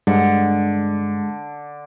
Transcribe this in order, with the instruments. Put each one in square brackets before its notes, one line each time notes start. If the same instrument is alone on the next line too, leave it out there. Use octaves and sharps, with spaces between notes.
[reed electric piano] G2 [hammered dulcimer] D3 [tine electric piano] G#3